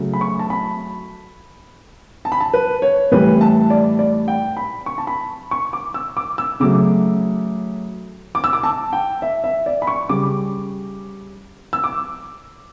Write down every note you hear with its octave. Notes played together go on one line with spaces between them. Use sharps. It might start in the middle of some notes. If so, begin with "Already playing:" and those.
Already playing: C#3 F#3 A3
B5
C#6
A5
B5
A5
B5
A5
B4
C#5
A2 E3 G3 B4
A5
D5
D5
G5
B5
C#6
A5
B5
C#6
D6
E6
D6
E6
C#3 F#3 A3 D6
D6
E6
D6
A5
G5
E5
E5
D5
B5
C#6
C#3 G3 D6
E6
D6